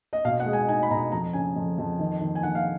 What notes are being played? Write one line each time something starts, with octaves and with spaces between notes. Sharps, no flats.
D#5
B2 F5
F#5
G#3
G#5
D#4 G#5
B5
B2 A#5
F2 A#5
C#3 G#5
F2
F2
D#3
D#3
G#5
D#3 F#5
F5